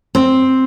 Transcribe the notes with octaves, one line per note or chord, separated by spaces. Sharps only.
C4